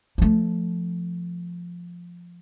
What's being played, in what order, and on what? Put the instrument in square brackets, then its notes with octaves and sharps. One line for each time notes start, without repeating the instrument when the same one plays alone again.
[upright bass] F3 A3